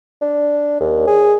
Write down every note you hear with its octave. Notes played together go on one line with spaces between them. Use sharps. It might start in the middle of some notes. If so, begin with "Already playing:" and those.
D4
D#2
G#4